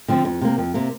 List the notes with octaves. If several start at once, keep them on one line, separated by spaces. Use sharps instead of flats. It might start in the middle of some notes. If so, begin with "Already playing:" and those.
D3 F3 C4
F2
C3 A#3
F2
C3 A#3